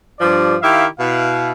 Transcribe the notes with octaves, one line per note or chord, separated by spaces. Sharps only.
G2 F3 D5
D#3 E4 G4 E5 F5
B2 E4 F5